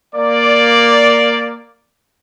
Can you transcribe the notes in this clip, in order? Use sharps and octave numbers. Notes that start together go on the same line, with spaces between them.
A#3 D5